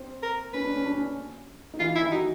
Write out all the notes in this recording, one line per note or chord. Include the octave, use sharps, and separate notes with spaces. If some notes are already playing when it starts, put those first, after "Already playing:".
Already playing: C4
A#4
C#4 B4
D4
C#4
D4
C#4
D#4
E3 E4 F4
E4
D#3 D#4
D#4 F#4